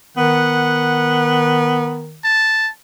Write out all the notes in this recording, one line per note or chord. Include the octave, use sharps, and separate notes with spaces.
D#3 B3 F#5
A5